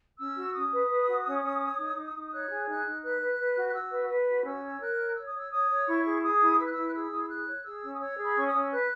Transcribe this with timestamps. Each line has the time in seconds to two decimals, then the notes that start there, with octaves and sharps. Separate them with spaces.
0.19 C#4 E6
0.37 F#4
0.54 C#4 D#6
0.72 B4
0.90 B4
1.07 F#4
1.25 C#4
1.43 C#4
1.61 C#5
1.78 D#4
1.96 D#4
2.14 D#4
2.32 C#5 F#6
2.50 G#4
2.67 D#4 F#6
2.85 D#4
3.03 B4 F#6
3.21 B4
3.38 B4
3.56 F#4
3.69 F#6
3.74 F#4 E6
3.92 B4
4.09 B4
4.27 F#4
4.45 C#4 E6
4.63 C#5
4.80 A#4 F#6
4.98 C#5
5.16 C#5 E6
5.27 D#6
5.33 C#5 E6
5.51 C#5 D#6
5.69 C#5
5.87 E4 C#6
6.04 G#4
6.22 G#4 D#6
6.40 E4
6.58 B4 E6
6.65 F#6
6.73 E4 E6
6.88 F#6
6.93 G#4 E6
7.11 E4 D#6
7.20 E6
7.29 G#4 F#6
7.47 C#5
7.64 G#4 E6
7.83 C#4
7.95 D#6
8.00 C#5 E6
8.17 G#4
8.25 B5
8.36 C#4 C#6
8.47 D#6
8.53 C#4
8.59 E6
8.71 B4 F#6